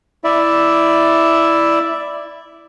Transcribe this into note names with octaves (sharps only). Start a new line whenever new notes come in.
E4 D5 E5